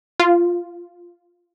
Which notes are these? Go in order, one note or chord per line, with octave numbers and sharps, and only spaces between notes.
F4